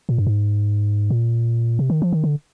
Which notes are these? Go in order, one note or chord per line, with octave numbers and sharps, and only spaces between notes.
A#2
G2
G#2
A#2
C3
D#3
F3
D#3
D3